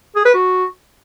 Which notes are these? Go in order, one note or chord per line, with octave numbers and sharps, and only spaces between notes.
G#4
B4
F#4